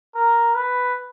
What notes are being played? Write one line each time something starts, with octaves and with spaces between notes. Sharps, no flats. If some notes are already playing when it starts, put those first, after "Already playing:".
A#4
B4